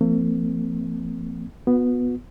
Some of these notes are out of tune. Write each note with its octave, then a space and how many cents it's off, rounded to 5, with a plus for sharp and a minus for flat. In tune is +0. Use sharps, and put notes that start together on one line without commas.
F3 -35 A3 +45 C4 -25
B3 +0 F#4 -30